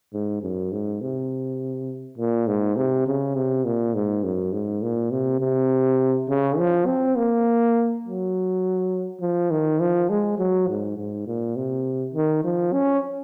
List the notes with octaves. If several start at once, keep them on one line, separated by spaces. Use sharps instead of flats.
G#2
F#2
G#2
C3
A#2
G#2
C3
C#3
C3
A#2
G#2
F#2
G#2
A#2
C3
C3
C#3
F3
C4
A#3
F#3
F3
D#3
F3
G#3
F#3
G#2
G#2
A#2
C3
D#3
F3
C#4